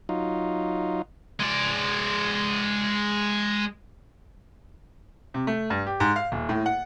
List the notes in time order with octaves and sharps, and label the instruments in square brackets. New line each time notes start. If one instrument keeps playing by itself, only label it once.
[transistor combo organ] F#3 D#4 F4
[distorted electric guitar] G#3 D5
[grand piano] C3
A3
G2
G4
G#2
F5
D#1
A2
F#5